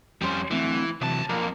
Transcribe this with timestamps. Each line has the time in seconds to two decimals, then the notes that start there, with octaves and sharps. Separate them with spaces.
0.22 F2 G3 C#4 C5 C6
0.51 D3 E3 A3 C4
1.01 B1 C3 E3 F#3 A5
1.29 F2 A#3 D4 A#4